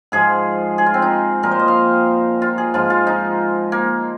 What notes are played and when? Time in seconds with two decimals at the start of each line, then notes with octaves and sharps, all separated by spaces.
0.12 G#2 F3 G#4
0.78 G#4
0.86 F4
0.94 C4
1.02 D#4
1.43 A#2 F3 A#4
1.51 C5
1.59 D#5
1.68 F5
2.42 F4
2.58 G#4
2.74 G#2 F3 F4
2.90 F4
3.07 D#4
3.72 A#3